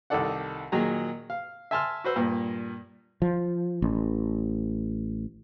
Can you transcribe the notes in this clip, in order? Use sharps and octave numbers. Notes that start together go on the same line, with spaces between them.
C2 D#3 D#4 A4 D5 F#5
A#2 D#3 F#3 G#4 A#5
F5
E5 G#5 A5 C6 E6 F6
F#4 B4 C5 E6
G2 A#2
F3
A1